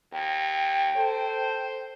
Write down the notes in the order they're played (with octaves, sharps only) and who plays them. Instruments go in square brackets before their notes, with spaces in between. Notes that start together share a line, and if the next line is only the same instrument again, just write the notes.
[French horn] D#2 [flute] G5
[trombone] A4 [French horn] C5